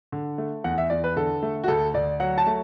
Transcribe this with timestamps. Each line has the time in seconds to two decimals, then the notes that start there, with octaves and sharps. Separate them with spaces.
0.12 D3
0.38 A3
0.64 E2 F#5
0.78 E5
0.90 E2 D5
1.04 B4
1.16 D3 A4
1.43 A3
1.64 F#4
1.68 D2 A4
1.94 D2 D5
2.20 F#3 F#5
2.38 A5
2.47 A3